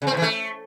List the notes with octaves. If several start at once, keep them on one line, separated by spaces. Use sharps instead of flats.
C#3
C4
A2
E3
A3